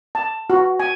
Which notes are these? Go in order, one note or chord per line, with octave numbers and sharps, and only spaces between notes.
A5
F#4
G#5